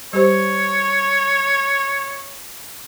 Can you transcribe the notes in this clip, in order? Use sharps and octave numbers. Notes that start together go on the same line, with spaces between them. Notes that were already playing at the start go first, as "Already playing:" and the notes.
G3 G4 C5 C#5